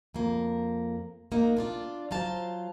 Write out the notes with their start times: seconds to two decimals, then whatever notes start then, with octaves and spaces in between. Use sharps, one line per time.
0.14 F2 A#3
1.32 A#3 D#4 F#4
1.57 D4 F4 D5
2.11 F#3 F4 C5 F5 A5